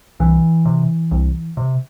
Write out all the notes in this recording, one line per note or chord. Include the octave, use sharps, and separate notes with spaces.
C2 E3
C3
C2
C3